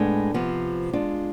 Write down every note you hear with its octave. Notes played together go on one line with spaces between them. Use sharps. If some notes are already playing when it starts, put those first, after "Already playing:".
Already playing: A2 G#3 B3 D4 A4
C3 F3 B3
G#3 D4 F4